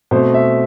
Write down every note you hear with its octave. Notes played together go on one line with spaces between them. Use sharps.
B2 A3 C4 C5
E5